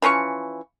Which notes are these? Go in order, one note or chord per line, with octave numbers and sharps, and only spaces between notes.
E3 F3 C#4 C#6